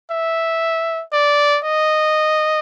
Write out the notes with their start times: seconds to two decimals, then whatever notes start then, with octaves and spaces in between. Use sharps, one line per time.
0.11 E5
1.13 D5
1.65 D#5